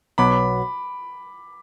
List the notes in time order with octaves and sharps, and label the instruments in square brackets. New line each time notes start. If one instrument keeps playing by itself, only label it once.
[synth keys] B1 B2 F#3 B3 [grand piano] B5 D6